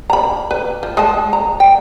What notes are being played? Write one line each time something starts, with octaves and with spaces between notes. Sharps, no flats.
A#5 B5
B4
F3
G#3 D#5 A5
A#5
G5